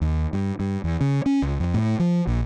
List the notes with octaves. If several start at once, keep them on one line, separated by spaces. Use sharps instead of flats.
D#2
G2
G2
E2
C#3
C#4
C#2
F2
A2
F3
A#1